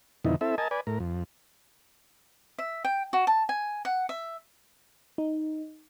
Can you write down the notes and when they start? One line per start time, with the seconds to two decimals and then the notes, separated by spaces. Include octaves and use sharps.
0.25 F2 B2 D3 D#3 D#4 E4
0.41 C4 E4 A4 E5
0.58 A#4 D#5 G#5 A5
0.71 B4 D5 G#5
0.87 A2 A#4
1.00 F2
2.59 E5
2.85 G5
3.13 F#4
3.27 A5
3.49 G#5
3.85 F#5
4.09 E5
5.18 D#4